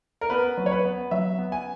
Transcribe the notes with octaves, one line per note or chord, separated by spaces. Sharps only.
A#4
B3 B4
F#3
C#5
B4
B3
F#3 E5
B3
G#5